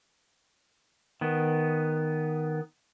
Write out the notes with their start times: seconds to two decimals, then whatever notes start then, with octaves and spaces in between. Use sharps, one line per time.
1.21 D#3 B3